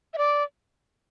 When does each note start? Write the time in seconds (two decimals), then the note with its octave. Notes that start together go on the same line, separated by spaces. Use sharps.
0.14 E5
0.18 D5